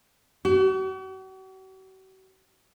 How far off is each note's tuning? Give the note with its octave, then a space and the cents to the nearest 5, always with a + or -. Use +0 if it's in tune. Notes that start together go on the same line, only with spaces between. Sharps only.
F#4 +45